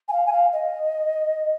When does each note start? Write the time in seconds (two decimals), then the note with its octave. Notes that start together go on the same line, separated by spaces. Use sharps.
0.08 G#5
0.12 F5
0.26 G#5
0.32 F5
0.52 D#5